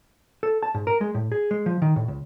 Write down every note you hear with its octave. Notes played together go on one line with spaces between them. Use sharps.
A4
A5
G#2
A#4
G#3
A2
G#4
G#3
F3
D#3
A2
C#2